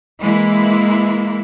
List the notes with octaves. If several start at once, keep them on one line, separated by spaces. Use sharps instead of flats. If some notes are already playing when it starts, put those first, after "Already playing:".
E3 G#3 A#3 E4